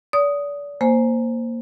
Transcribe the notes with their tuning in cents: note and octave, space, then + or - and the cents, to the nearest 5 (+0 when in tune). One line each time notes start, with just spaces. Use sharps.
D5 -35 D#6 +0
A#3 +0 C5 +0 G#5 +10